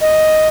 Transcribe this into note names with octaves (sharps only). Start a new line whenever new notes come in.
D#5